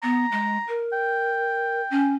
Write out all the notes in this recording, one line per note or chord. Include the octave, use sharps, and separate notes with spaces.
B3 A#5
G#3
A#4
G5
C#4